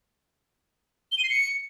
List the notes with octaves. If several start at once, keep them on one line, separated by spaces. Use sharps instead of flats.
G7
D#7
C7
C#7